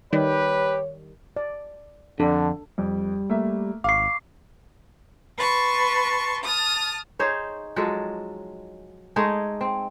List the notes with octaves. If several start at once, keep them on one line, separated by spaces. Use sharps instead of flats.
D#3 G3 G4 B4 C#5
D5
F2 D3 D4 A4
F2 G3
A3 A#3 E5
G#1 F5 C#6 D6 C7
B4 A5 C6 C#6
A5 D#6 F6
D#4 G#4 C5 C#5
F3 F#3 G#3 A4
G#3 A3 D#4 G#4
C4